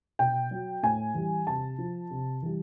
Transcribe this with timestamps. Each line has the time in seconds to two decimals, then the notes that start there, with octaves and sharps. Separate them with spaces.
0.19 B2 G5
0.51 F#3
0.83 A2 G#5
1.15 E3 G3
1.47 C3 A5
1.78 F3
2.11 C3
2.43 E3 G3